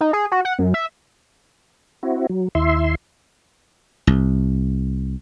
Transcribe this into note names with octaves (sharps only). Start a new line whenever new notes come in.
D#4
G#4
F#4
F#5
F#2
E5
C4 E4 F#4
F#3
D#2 E4 E5 C6
C2